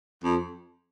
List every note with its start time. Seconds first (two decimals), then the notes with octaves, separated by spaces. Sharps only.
0.24 F2